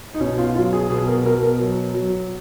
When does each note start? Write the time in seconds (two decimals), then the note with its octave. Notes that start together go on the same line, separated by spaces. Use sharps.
0.14 D#4
0.20 B2 C#4
0.38 F4
0.55 F#3 F4
0.73 G#4
0.90 B2 G#4
1.07 A#4
1.25 B2 A#4
1.42 A#4
1.59 F#3
1.94 F#3